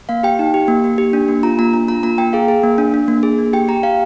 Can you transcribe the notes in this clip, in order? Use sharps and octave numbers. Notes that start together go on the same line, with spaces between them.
A#3 F5
G4 G5
D#4
G4
A#3
A#3
G4
D4
A#3
F4 A#5
A#3 A#5
D4 A#5
F4 A#5
A#3 A#5
A#3 G5
G#4 F5
G#4
A#3
D4
D4
A#3
G#4
A#3
G4 G5
G4 A#5
G4 F5